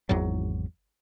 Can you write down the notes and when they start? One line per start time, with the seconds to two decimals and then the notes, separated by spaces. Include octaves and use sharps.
0.09 G#1 E2 G#2 F#3